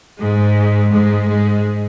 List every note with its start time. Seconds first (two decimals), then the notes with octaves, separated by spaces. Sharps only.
0.18 G#2 G#3
0.91 G#2 G#3
1.27 G#2 G#3